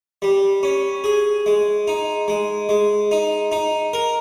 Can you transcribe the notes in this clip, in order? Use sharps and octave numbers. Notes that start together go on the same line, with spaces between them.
G3
C#4
G#4
G#3
D#4
G#3
G#3
D#4
D#4
A#4